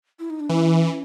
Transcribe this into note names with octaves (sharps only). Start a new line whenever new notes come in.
E4
D#4
D4
E3 C#4